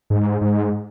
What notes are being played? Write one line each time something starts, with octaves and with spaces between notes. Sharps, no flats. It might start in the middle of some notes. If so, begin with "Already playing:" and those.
G#2
G#2